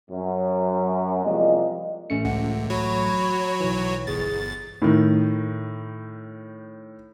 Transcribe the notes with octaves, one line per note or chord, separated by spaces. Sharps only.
F#2
C2 F3 G3 G#3 A#3 D#5
A1 A3 C#4 C#7
C#2 F#5
F#3 F#4 C#5 B5
B1 E3
G1 G#4 A6
A2 D#3